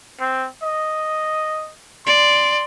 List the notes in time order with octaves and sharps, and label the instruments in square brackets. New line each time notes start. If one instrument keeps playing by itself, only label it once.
[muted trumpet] C4
D#5
[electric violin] D5 [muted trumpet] C6